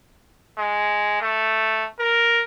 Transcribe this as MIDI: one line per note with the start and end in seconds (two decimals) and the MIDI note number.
0.58 1.20 56
1.21 1.86 57
1.99 2.42 70